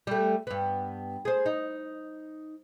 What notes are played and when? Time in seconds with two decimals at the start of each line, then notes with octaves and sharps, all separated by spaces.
0.07 G3 A3
0.47 G2 B3
1.25 G#4 C5
1.46 D#4